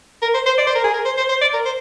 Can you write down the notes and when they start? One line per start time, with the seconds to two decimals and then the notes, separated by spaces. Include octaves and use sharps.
0.22 A#4
0.34 C5
0.46 C5
0.58 D5
0.67 C5
0.75 A#4
0.84 G#4
0.94 A#4
1.05 C5
1.17 C5
1.29 C5
1.41 D5
1.53 A#4
1.65 C5